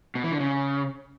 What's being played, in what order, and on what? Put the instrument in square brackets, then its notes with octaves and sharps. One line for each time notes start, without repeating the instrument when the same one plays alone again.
[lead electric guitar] B2
E3
D3
C#3